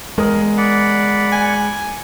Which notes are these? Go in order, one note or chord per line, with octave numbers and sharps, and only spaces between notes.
E2 G#3 A#4 D#6
D5 F#5 B5
G#5